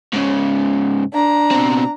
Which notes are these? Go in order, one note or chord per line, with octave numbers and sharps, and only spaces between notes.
G#2 C#3
D4 A#5
B2 C4